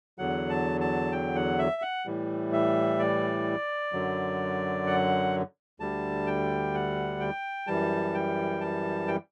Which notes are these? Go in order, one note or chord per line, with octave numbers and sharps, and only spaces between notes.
E2 D3 F#3 F#5
A5
A5
G5
F#5
E5
F#5
A2 E3 G3
E5
D5
F#2 D3 F#3
F#5
D2 D3 G3 A5
G5
F#5
G5
F#2 E3 G3 A5
G5
A5
G5